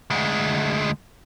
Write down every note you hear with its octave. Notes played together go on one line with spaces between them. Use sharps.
D2 G#3